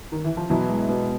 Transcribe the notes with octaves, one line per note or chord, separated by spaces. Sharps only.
D#3
E3
F3
B2 E3 F#3
G#3
B2